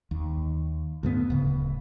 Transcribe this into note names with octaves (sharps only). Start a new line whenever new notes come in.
D#2
D2 G2 B3
D1 C#3